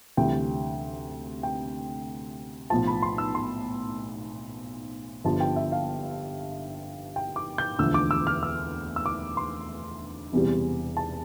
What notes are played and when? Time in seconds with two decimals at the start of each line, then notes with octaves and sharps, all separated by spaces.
0.17 D2 C3 E3 G3 G5
1.43 G5
2.70 B1 A2 F3 A5
2.87 B5
3.02 C6
3.18 E6
3.35 C6
5.24 G1 G2 F3 A5
5.40 G5
5.56 E5
5.72 F5
7.16 G5
7.36 D6
7.58 G6
7.79 E1 D2 D3 F3 E6
7.94 D6
8.11 E6
8.27 F6
8.43 E6
8.96 E6
9.06 D6
9.37 C6
10.32 E1 E2 C3 E3 G3
10.97 A5